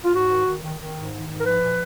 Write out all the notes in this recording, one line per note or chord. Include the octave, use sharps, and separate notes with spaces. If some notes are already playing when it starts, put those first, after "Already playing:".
F4
G#2 F#4
D#3
D#3
D#3
D#3
G#2
D#3
G#2
A#4
F3 B4
A#2